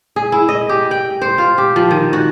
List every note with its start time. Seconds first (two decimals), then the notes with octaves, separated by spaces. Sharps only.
0.16 G#4
0.32 E4
0.49 D#5
0.69 G4
0.91 G5
1.22 C5
1.38 F4
1.58 G4
1.76 F3
1.91 D#3
2.13 F#4